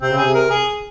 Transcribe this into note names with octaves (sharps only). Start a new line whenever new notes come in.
C3 C4
C#3
C3 G#4
A#4
G#4